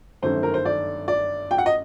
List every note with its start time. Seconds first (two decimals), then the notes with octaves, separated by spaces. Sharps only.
0.22 G1 F#2 D#3 A3 C5
0.43 A#4
0.54 C5
0.65 D5
1.08 D5
1.51 G5
1.58 F#5
1.66 D#5